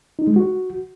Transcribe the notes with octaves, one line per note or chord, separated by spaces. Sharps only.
D#4
G#3
F#4